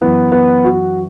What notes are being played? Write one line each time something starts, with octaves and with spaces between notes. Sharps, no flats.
F#2 E3 B3
B3
F#4